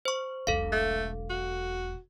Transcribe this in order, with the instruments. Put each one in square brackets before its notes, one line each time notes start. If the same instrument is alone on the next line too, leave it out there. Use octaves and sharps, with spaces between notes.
[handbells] C5 C#6
[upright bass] E1 B1 [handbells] A4 F5
[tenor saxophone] A3
F#4